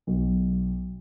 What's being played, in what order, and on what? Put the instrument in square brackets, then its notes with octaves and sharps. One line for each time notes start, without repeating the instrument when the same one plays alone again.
[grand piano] B1